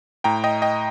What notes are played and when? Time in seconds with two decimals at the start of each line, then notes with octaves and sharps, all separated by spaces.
0.24 A2 G5 A#5
0.44 D#5 G5
0.62 D#5 G5